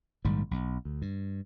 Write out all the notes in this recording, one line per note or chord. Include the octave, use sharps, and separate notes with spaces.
A#1 G#2 D#3 G3
B1
D2
G2